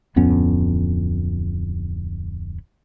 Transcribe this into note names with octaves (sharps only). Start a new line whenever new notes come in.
D1 F2 B3 C#4